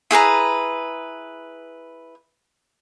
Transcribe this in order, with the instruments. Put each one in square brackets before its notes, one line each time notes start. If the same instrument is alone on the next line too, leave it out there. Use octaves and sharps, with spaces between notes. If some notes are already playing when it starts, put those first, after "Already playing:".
[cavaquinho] E4 G#4 B4 A#5